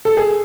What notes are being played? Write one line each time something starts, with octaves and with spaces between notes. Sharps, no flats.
A4
G#4